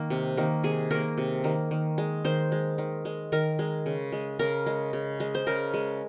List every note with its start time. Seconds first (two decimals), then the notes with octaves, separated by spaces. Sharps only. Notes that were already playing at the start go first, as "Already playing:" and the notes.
Already playing: D#3 A#3
0.10 C3
0.38 D#3 A#3
0.64 C3 G#4
0.91 D#3 A#3 A#4
1.18 C3
1.44 D#3 A#3
1.71 D#3
1.98 G#3
2.25 D#3 C5
2.52 G#3
2.78 D#3
3.05 G#3
3.32 D#3 A#4
3.59 G#3
3.86 C#3
4.12 G#3
4.39 C#3 A#4
4.66 G#3
4.93 C#3
5.20 G#3
5.35 C5
5.47 C#3 A#4
5.74 G#3